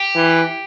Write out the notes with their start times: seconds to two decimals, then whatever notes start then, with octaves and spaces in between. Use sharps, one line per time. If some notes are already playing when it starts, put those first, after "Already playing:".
Already playing: G4
0.16 E3